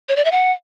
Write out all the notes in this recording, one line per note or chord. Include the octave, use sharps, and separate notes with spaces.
C#5
D5
E5
F#5